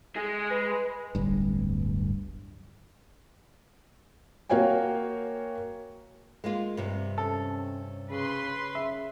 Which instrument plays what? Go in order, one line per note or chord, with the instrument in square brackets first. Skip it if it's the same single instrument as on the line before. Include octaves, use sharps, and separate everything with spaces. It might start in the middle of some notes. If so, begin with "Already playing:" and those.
[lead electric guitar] G#3 G#4
[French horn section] B4
[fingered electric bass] D1 G1 G2
[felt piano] A#3 F#4 C#5 F5 G5 G#5
[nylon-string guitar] G#3 A#3 F4
G2 C3
[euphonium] C#4 [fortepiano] A4
[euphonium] C#3 [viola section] B4 C6
[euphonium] C#3 [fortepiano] E5